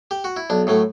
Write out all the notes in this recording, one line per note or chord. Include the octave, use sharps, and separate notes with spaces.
G4
F#4
E4
B1 D4
A2 F#3 A3